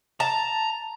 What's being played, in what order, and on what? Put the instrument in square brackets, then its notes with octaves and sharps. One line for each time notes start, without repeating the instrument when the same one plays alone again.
[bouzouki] A5 [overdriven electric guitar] A#5